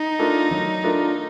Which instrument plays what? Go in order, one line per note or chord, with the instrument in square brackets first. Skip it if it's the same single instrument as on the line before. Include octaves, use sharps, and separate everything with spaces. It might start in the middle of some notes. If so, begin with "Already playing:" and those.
Already playing: [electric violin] D#4
[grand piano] A3 D4 F4 A#4
F#3
A3 D4 F4 A#4